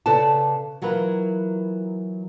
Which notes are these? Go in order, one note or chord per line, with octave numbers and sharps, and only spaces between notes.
C#3 A4 B4 D5 A5
E3 F#3 F4 A#4 B4